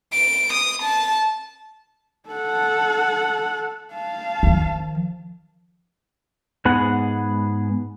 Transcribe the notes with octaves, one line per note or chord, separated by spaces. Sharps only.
D7
D#6
A5
A4 F#5
F5 A5
D#3 F3
G#2 B3 G#4 F#5